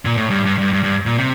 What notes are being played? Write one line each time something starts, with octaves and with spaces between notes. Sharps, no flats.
A#2
A2
G2
G2
G2
G2
G2
A#2
C3